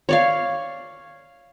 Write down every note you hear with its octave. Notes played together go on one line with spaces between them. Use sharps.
C#5 D5 F5